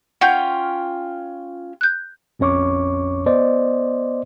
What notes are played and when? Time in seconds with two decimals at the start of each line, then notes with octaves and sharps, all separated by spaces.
0.21 C#4 F4 F#5 G5 G6
1.81 F#6 G6
2.39 A#1 F2 C#4 C#5 C#6 D6
3.26 B3 C5 D5 D#5